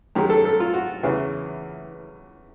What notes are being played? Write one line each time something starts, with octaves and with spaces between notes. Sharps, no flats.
F#2 D#3 G#3 G4
A4
A4
F4
F#4
E2 C#3 E3